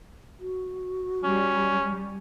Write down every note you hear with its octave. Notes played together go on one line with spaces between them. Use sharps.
F#4
G3 C#4